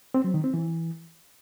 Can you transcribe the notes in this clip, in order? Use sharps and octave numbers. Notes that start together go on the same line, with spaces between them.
C4
F#3
D#3
C4
E3